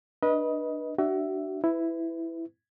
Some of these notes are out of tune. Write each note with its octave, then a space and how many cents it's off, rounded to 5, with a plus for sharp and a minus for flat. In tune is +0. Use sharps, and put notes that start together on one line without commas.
D4 +20 B4 -25 D#5 +15
D4 +15 F#4 +35 E5 +5
E4 +0 B4 +25